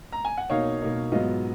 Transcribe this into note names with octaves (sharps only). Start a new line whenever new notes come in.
A#5
G#5
F#5
B2 A#3 D#4 C#5 F5
B2 A#3 D#4
G#2 F#3 B3 F4 D#5